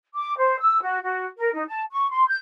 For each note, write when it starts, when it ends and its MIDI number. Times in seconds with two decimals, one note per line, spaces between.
0.15 0.37 86
0.37 0.59 72
0.60 0.82 88
0.82 0.98 66
1.03 1.25 66
1.38 1.50 70
1.54 1.64 63
1.68 1.82 81
1.91 2.10 85
2.10 2.24 84
2.27 2.37 91